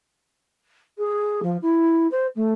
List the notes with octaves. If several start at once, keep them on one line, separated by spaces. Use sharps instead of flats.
G#4
F3
E4
C5
A3